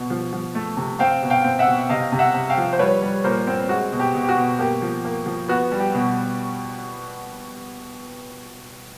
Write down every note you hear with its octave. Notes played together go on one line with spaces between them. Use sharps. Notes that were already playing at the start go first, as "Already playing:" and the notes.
Already playing: B2
F3
F3
A3
C3
C4 F5 G5
B2
F5 G5
C4
E5 F#5
B2
C3 D#5 F5
C3
E5 F#5
C3
F5 G5
F3
C5
G3 B4 C#5
G3
A#2 A#4 C5
C4
G#3 F#4
B2
G4
B2
G4
F#4
B2
A#3 G4
F3
A#3
F3
B3 F#4
G3
G4
B2